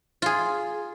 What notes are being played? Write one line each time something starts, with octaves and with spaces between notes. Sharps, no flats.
F4 G#4